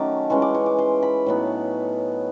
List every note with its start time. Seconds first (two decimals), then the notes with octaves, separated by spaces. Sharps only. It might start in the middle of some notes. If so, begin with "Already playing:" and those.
Already playing: D#3 F#3 A3 C#4 D6
0.30 E3 G#3 C#4 C#6
0.42 D6
0.55 C#6
0.66 D6
0.78 C6
1.03 B5
1.26 A2 F#3 B3 D#4